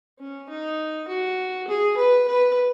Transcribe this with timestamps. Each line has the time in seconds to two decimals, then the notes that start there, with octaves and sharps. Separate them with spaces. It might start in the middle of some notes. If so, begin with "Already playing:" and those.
0.19 C#4
0.49 D#4
1.08 F#4
1.68 G#4
1.97 B4
2.28 B4